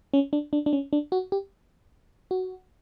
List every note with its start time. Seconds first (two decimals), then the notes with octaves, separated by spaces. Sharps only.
0.14 C#4
0.33 D4
0.53 D4
0.66 D4
0.73 C#4
0.93 D4
1.12 F#4
1.32 G4
2.31 F#4